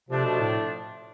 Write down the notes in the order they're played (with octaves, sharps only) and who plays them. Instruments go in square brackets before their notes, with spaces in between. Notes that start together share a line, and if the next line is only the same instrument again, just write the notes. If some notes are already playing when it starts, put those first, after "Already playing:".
[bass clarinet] C3 [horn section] F3 A3 D4
[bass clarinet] B2
A2